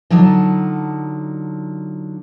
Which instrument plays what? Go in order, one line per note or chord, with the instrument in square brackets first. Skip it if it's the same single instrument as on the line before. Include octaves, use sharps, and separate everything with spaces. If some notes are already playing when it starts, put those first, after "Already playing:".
[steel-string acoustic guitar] D3 F#3 D#4 F4 A5